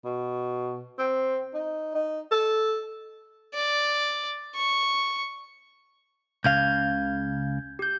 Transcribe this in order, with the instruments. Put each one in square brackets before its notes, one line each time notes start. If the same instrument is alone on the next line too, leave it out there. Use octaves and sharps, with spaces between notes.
[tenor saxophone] B2
C4
D#4
D#4
A4
[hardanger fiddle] D5
C#6
[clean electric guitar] C#2 C#3 F5 [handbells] G6 G#6
[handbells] G4 G6